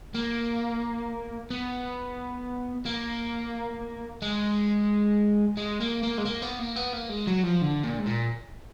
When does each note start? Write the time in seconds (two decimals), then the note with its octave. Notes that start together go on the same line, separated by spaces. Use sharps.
0.15 A#3
1.51 B3
2.85 A#3
4.22 G#3
5.57 G#3
5.80 A#3
6.03 A#3
6.18 G#3
6.25 A#3
6.43 B3
6.59 A#3
6.76 B3
6.93 A#3
7.10 G#3
7.27 F#3
7.44 F3
7.61 D3
7.84 A#2
7.98 G#2
8.06 A#2